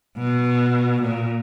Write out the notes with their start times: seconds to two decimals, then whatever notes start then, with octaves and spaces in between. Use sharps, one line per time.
0.17 B2
1.02 A#2